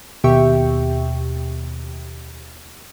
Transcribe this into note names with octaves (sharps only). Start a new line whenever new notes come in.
D#2 B2 G4 E5 G5 C#6